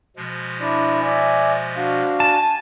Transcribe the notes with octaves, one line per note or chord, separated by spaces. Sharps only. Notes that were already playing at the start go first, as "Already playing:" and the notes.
B2 F3 G#3
D4 E4 D5
D5 E5 G#5
D4 F#4 F5
G#5 A5